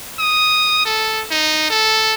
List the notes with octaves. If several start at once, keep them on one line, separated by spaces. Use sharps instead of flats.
D#6
A4
D#4
A4